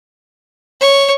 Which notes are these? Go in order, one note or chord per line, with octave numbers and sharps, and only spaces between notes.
C#5